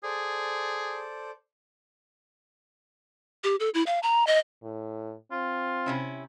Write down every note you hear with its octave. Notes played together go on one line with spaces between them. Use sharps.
G#4 A4 C5 D5
G4
A4
E4
F5
A#5
D#5
A2
C4 F4
C3 C#4 E4